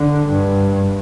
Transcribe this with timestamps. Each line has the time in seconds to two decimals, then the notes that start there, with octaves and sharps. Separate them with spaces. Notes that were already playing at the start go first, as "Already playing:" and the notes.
Already playing: D3
0.27 G2